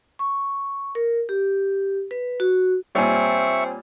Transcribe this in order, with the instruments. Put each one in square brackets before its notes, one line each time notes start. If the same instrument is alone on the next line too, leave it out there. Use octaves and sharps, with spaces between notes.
[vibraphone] C#6
A#4
G4
B4
F#4
[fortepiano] A#2 G3 [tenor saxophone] C4 [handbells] C#5 G#5 [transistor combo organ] E5 C#6